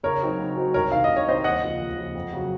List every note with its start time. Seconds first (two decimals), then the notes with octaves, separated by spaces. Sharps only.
0.03 C#3 A#4 C#5
0.22 F#3 C4 D#4 F#4
0.40 C#3
0.56 F#3 C4 D#4 F#4
0.74 C2 A#4 C#5
0.92 C3 D#3 F5
1.04 D#5
1.10 C2
1.16 C#5
1.27 C3 D#3 C5 D#5
1.44 D#2 D#5 F#5
1.63 C#3 F3
1.81 D#2
1.97 C#3 F3
2.15 F2
2.33 C#3 F#3